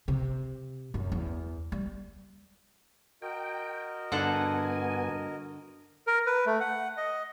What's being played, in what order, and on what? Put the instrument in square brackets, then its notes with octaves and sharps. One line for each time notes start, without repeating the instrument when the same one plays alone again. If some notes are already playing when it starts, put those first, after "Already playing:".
[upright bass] C3
F#2
E2
G3
[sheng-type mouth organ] F#4 A#4 D#5 [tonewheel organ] G5
[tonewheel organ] G2 B3 G#5 [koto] D3 A4 F#5
[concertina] A#4
B4
A3
F#5
D#5